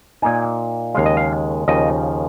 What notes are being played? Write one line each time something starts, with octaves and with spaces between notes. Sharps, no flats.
A#2 A#3 D#4 G#5
D#2 C#3 G#3 F5
D#5
F5
D#2 C#3 F3 D#5